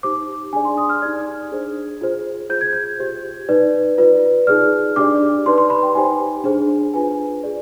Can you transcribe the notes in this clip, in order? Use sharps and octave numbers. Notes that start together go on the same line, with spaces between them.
D#4 G4 C5 D6
D4 G#4 D5 G#5
C6
D#6
F6
D#4 G4 D5 G#6
D4 G#4 C5
F4 G#4 C5
F4 G#4 C5 G6
G#6
G6
G4 C5
D#4 B4 D5
F4 B4 D5
D#4 G#4 D5 F6
D4 G4 D5 D6
D#4 G4 B4 D5 C6
C6
B5
G5
D#4 G4 C5 G#5
D4 G#4 C5
D4 F4 B4 G#5
G#4 D5